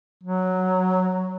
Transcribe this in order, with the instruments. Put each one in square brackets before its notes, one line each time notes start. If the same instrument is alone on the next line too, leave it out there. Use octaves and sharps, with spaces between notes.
[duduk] F#3